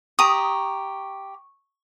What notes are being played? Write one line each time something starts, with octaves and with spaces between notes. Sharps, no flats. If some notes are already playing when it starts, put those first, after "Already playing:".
G4 A#5 C#6 D#6